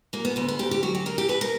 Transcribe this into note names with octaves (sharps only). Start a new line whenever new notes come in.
F#3 A#3
B3
D2 B3
B3
D2 G4
G4
F#3 F#4
G4
F#3 A#4
G4
B2 B4
A#4